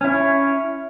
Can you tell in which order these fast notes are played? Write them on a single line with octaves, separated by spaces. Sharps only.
C#4 E4 C#5